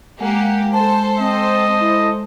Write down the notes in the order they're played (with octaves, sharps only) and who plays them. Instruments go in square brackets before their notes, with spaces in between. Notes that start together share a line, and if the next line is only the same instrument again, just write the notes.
[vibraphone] G#3 [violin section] A#3 G4 [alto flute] F#5
[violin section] A4 C5 [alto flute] A5
[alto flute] C4 [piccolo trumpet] D#5
[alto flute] E4